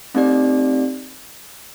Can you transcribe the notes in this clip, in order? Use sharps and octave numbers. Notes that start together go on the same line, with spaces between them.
A3 C4 D#4 G4 D5